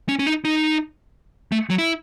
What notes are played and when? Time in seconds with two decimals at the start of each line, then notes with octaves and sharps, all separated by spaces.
0.09 C#4
0.19 C#4
0.27 D#4
0.45 D#4
1.52 A3
1.70 F#3
1.78 E4